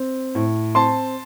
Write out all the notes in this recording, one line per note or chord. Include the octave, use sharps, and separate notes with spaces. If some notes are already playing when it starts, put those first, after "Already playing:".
Already playing: C4
A2
C4 A5 C6